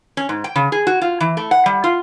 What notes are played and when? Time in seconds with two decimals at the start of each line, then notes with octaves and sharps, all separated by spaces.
0.17 C#4
0.29 G#2
0.44 G5
0.56 C#3
0.72 G#4
0.87 F#4
1.02 F4
1.20 E3
1.37 A3
1.51 F#5
1.66 G3
1.84 F4